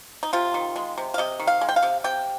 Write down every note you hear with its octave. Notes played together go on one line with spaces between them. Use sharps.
D#4
C3 F4
D#3
G#3
C3
F5
C3 D#5
D#3
F5
G#3
G5
F5
C3
C3 G5